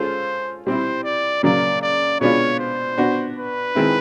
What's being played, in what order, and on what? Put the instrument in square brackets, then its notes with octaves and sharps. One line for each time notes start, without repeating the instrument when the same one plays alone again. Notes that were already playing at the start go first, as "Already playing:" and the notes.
Already playing: [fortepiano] G#3 C#4 F4 A4 [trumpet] C5
[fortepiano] G3 C4 E4 [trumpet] C5
[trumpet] D5
[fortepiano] C#3 F#3 A#3 [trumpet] D5
[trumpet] D5
[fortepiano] B2 G#3 B3 D4 F4 [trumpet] C#5
[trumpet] C5
[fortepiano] B3 D4 F#4
[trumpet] B4
[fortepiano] D#3 G#3 C4 E4